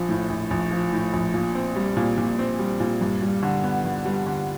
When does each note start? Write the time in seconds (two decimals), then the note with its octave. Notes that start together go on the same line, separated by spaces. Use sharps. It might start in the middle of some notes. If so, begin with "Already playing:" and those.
Already playing: A#1 F3
0.09 A2
0.29 A#1
0.51 A#1
0.71 F3
0.93 A2
1.13 A#1
1.34 A#2
1.55 C4
1.76 G3
1.97 A#2
2.18 A#2
2.39 C4
2.59 G3
2.80 A#2
3.01 G2
3.22 G3
3.43 D3
3.63 B3
3.84 G2
4.05 G3
4.26 D3